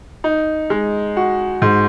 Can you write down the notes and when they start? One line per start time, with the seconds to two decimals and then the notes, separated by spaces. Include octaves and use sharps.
0.24 D#4
0.70 G#3
1.17 F#4
1.62 G#2